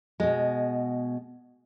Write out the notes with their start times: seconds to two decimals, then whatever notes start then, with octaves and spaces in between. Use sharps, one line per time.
0.20 B2 G#3